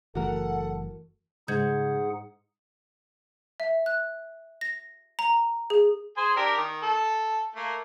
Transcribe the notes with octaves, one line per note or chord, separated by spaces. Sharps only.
F#1 E3 A3 F#4 A4 A#4 F#5
G#2 C#3 D#4 G#4 F#5 G6 G#6
E5
F#6
A#6
A#5
G#4
G#4 C5 G#5
D4 G4 A#4
D#3
A4
A3 A#3